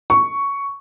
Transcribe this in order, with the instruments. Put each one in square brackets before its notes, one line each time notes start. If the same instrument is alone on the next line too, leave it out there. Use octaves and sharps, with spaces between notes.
[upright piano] C#6